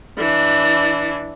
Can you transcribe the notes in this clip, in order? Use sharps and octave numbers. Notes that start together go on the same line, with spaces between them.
E3 D4